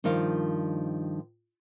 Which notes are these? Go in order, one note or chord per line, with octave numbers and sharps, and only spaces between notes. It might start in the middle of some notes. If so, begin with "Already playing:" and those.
G2 D#3 F3 A#4 F5